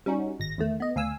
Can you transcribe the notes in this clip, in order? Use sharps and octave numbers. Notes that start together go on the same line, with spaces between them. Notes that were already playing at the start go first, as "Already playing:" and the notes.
G3 C#4 D#4 F#4
G#1 A#6
E2 D#3 A3
B3 D#5
D2 F5 G#5 E6